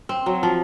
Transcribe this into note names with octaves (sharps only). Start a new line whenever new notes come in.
C4
F#3
F3